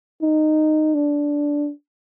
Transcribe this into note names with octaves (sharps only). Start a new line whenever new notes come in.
D#4
D4